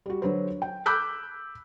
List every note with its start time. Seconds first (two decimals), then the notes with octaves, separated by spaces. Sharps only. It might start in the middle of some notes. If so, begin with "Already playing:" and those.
0.06 G3 F#4
0.22 D3 F#3 B4 C5
0.62 G5
0.86 B5 D6 E6 F#6 G6 B6